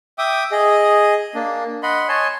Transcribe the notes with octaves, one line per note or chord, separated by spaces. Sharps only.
E5 G5 D6 D#6
G#4 D#5
A#3 D4
D#5 F#5 B5 C6
C#5 D#5 G#5 A5 C6